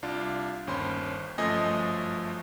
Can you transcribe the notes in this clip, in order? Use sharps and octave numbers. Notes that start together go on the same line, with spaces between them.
C2 D4 F4
G1 D#2 C#4 C5 B5 C6
G1 F#2 F3 A3 D#5 G#5